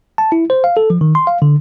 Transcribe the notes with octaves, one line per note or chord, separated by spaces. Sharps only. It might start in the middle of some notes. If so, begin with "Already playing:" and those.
A5
E4
C5
F5
A4
F3
D#3
C6
F5
D3